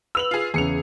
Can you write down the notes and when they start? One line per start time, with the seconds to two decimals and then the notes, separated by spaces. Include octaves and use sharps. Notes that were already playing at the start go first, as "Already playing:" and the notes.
0.15 B4 E6 F7 F#7
0.31 F4 G#4
0.54 E2 C#3 G#4 C#7 F7